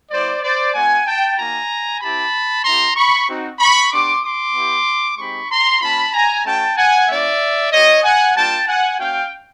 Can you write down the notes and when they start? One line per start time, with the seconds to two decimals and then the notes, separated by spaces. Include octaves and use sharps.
0.11 G3 B3 E4 C5 D5
0.42 C5 D5
0.74 A3 C4 F4 F#5 G#5
1.05 G5 A5
1.37 A#3 D#4 F#4 G#5 A#5
2.01 C4 E4 G4 A5 B5
2.64 B3 E4 G4 A#5 C6
2.96 B5 C#6
3.27 C4 D#4 F#4
3.59 B5 C#6
3.91 B3 D4 G4 C6 D6
4.23 C6 D6
4.55 B3 E4 G4
5.18 G#3 C4 D#4 G4 B5 C#6
5.50 A#5 C6
5.81 A#3 C#4 F4 A5 B5
6.13 G#5 A#5
6.45 A3 C#4 F#4 G5 A5
6.77 F#5 G#5
7.08 A#3 C#4 E4 D5 E5
7.71 B3 E4 G4 C#5 D#5
8.03 F#5 G#5
8.35 G3 A#3 D4 F4 G5 A5
8.67 F#5 G#5
8.98 A#3 C#4 F#4 F5 G5